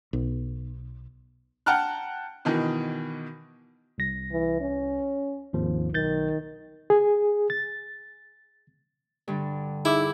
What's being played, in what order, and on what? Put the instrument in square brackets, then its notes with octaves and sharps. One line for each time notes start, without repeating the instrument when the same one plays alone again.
[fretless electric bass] B1
[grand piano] F#5 G5 A5 A#5 F6 F#6
B2 D#3 E3
[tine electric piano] C2 A#6
[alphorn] E3
C#4
[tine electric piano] G#1 D#2 F3
[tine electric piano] B1 G6 A6 [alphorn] D#3
[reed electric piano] G#4
A6
[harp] G2 D3
[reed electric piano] D#4 E6 [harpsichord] E4 [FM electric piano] G#4 E5 D6